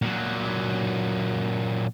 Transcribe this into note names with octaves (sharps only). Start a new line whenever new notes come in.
A#2 F#3